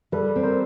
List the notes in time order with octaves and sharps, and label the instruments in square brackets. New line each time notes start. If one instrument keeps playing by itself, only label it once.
[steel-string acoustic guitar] G3 [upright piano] A4 B4
[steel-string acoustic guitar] C4
[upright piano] A#4 C5